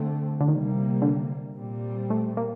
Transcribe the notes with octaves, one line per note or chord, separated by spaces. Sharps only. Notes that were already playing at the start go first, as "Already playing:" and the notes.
Already playing: D3 A3 C4
D3
C3 D#3 G3 A#3
D3
A#2 G3 C4
A3
A#3